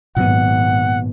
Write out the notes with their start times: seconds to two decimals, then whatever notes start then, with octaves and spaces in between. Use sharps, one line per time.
0.16 G#1 A#2 F#3 B3 F#5